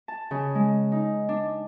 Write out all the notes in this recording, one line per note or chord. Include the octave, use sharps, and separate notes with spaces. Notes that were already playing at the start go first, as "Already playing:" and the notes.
A5
C#3
G#3
D#4
D4